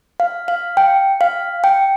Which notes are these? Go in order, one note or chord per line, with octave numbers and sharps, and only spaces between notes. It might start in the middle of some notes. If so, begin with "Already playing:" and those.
F5
F5
G5
F5
G5